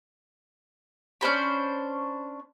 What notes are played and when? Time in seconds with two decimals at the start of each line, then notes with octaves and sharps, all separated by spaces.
1.21 C#4 D4 C5 B5